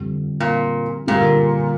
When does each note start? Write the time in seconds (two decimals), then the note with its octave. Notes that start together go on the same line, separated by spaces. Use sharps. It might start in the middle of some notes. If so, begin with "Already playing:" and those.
Already playing: F2 D3 G3
0.40 A#2
1.07 A#2 D3 G3 A#3 F4